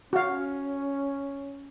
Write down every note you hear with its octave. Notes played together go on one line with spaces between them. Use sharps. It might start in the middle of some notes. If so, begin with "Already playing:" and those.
C#4 F#4 F5